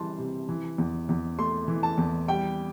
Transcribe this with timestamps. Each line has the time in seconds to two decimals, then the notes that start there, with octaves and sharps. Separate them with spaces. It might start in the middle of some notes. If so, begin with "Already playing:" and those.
Already playing: E3 G3 A5 C6
0.18 C3
0.49 E3
0.78 E2
1.09 E2
1.38 A3 C6
1.68 E3
1.83 A5
1.98 E2
2.28 G3 G5